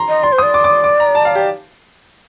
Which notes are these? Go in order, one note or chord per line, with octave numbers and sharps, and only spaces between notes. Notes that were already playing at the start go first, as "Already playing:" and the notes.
Already playing: A#5 C6
D#5
D5 C6
C5
D5 D#6
D6
D6
D6
A#5
A5
F5
G4